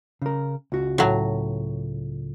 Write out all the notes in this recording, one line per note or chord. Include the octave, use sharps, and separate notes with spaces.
C#3 A#4
C#2 F#4
A2 F#3